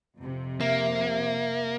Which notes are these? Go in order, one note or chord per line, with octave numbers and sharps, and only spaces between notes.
F2 C3
A#3 E5